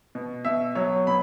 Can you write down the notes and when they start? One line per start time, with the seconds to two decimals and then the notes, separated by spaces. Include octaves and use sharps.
0.15 B2
0.45 B2 E5
0.75 F#3 C#5
1.07 B2 B5